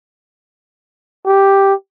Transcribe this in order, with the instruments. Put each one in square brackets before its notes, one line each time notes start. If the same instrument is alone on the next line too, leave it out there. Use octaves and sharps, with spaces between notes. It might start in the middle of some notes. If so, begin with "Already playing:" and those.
[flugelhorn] G4